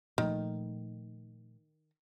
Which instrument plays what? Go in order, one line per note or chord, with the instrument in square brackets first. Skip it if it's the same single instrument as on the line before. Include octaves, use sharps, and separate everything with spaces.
[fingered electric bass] A#2 F3 A3 [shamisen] D#3